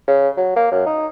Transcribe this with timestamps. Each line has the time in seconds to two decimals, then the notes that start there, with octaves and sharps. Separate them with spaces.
0.07 C#3
0.37 F#3
0.56 A#3
0.72 F#2
0.86 D#4